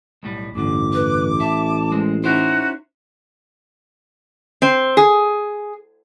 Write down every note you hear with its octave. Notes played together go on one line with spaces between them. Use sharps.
B1 A2 G3
A1 E2 G2 D3 D6
B4
E5 A5
G#3 C4
C#4 D#4 E4 F#4 C5
C4
G#4